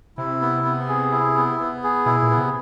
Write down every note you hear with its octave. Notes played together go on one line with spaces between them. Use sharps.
C3 E4
B3
B3
G#4
E4
B3
B3
G#4
B2 E4
A#2
B3
C3